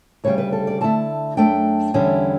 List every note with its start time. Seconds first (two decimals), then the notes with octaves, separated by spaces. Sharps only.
0.24 D2 C#3 G3 C#5
0.38 B4
0.53 A4
0.67 D5
0.81 D3 A3 E4 A5
1.37 F#2 E3 A3 D4 G5
1.94 E2 D3 G3 C#4 E4